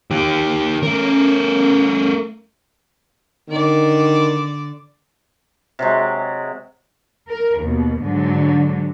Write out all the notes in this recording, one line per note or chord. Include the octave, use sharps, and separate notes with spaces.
D#3 G4
A3 C#4 A#4
D3 D#3 D5
C3 F#3 G#3
A#4
D#2 B2
G#2 D3 F#3